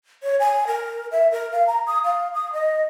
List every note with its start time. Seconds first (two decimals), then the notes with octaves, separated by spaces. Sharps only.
0.23 C#5
0.40 G#5
0.67 A#4
1.12 E5
1.31 A#4
1.52 F5
1.67 A#5
1.87 D#6
2.04 F5
2.34 D#6
2.53 D#5